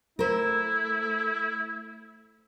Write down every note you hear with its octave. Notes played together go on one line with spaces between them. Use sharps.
A3 E4 A#4 C5